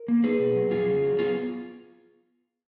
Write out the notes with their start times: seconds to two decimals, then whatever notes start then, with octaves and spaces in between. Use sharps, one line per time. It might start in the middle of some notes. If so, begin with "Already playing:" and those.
Already playing: A#4
0.08 A#3
0.24 D#4 G#4 B4
0.39 B2
0.55 F#3
0.71 F2 F4 G#4
0.88 C#3
1.03 F#3
1.18 B3 F4 G#4